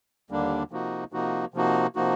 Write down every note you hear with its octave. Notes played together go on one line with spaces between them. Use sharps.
D#2 D3 G3 A#3 D4
C3 F3 A#3 D#4 F#4
C3 F3 A#3 D#4 F#4
C3 F3 A#3 D#4 F#4
C3 F3 A#3 D#4 F#4